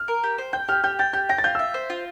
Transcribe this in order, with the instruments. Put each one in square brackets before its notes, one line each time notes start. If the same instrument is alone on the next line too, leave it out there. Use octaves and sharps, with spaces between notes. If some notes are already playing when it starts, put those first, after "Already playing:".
Already playing: [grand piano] F6
[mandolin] A#4
G4
C5
[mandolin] G5 [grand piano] G6
[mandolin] G4 [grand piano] F6
[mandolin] G4 [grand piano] G6
[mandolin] G5 [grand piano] A6
[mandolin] G4 [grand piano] G6
[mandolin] G5 [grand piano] A#6
[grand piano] A6
[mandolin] F4 [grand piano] G6
[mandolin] E5 [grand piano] E6
[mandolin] C5
F4